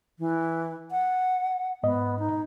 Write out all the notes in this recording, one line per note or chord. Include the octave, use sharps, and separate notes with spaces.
E3
F#5
G#2 B3 D#5
D#4